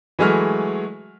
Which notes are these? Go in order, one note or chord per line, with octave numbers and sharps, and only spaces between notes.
E3 F#3 G#3 A3 F6